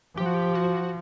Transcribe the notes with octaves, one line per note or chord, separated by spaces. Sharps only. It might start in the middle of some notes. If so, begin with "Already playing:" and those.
F3 G4
F#4
G4
F#4